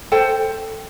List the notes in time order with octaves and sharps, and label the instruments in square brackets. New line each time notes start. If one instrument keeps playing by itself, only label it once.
[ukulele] A4 C5 G5